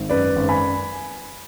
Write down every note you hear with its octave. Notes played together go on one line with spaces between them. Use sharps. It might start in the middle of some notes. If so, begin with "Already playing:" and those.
Already playing: G#1
F#2 B4 D5
G#1
G#5 B5